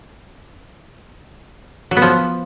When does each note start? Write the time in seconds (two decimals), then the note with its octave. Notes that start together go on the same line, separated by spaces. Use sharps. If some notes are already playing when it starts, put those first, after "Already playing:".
1.91 F#3
1.97 B3
2.02 F3